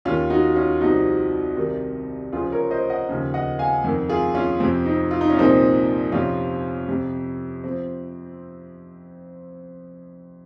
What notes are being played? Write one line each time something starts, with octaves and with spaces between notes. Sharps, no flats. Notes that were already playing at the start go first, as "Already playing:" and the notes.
D#2 D#3 C#4 F4
D#4 F#4
C#4 F4
C2 C3 F3 D#4 F#4
C2 C3 D#3
C#2 C#3 F3 F4 G#4
A#4 C#5
C5 D#5
D#5 F#5
D#2 C#3 F3
D#5 F#5
F5 G#5
F2 D#3
F4 G#4
C#4 F4
F2 C3 F3 C4
C4 D#4
F4
D#4
C#4
C2 A#2 F3 C4 D#4
F2 C3 F3 C#4 F4
F2 C3 F3
F3 C4